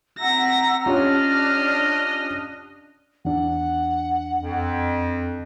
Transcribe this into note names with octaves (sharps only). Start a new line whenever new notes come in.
C4 E5 F#5 A#5 E6 A#6
C#4 D4 F4 G4 D#5 F6 F#6
E2 D4 F#5
F2